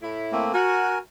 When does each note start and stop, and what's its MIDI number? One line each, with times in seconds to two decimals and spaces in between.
0.02 0.47 45
0.02 0.47 64
0.32 0.52 57
0.32 0.52 58
0.32 0.52 60
0.53 0.98 66
0.53 0.98 70
0.53 0.98 80